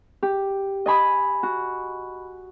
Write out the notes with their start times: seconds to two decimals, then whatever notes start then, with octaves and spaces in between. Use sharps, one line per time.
0.23 G4
0.86 D#5 G#5 B5 D#6
1.43 F#4